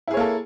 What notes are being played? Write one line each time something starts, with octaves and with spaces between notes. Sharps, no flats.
A#3 E4 G#4 A4 C#5